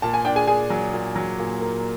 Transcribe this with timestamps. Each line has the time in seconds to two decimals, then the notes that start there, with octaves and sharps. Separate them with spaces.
0.02 A#2 A5
0.14 G#5
0.25 D4 G5
0.36 G#4 G#5
0.47 D4 G#4 G#5
0.70 F#3
0.93 A#2
1.16 F#3
1.39 A#2
1.61 A#3